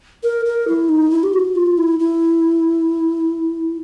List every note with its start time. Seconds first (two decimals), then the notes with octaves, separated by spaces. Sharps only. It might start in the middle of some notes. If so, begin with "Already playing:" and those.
0.24 A#4
0.45 A#4
0.68 E4
0.89 D#4
1.11 E4
1.23 G4
1.33 F#4
1.55 F4
1.78 E4
1.99 E4